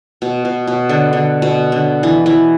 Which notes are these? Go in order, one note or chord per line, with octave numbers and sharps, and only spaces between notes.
B2
B2
B2
D3
D3
B2
D3
E3
E3